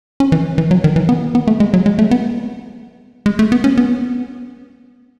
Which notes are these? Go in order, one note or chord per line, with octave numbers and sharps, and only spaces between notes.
C#4
E3
E3
F#3
D#3
E3
B3
B3
A3
G#3
F#3
G#3
A3
B3
G#3
A3
B3
C#4
B3